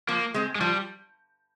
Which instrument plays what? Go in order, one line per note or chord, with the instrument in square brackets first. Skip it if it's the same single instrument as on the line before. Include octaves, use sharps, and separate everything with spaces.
[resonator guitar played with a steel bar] F3 [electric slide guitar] A#3
[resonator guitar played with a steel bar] G#3 C4
[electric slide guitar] G#3
[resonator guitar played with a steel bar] F3 [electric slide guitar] G3